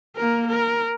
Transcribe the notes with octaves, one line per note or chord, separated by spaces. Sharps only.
A#3 A#4
A#4